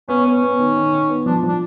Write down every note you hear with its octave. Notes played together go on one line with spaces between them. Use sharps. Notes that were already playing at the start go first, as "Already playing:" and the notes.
B3 C#4
B3 C#4
B3
D#3
D#3
D#3
B3
F3 D4
F3
D4